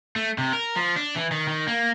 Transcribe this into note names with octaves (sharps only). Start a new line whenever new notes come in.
A3
C3
A#4
F3
D4
E3
D#3
D#3
A#3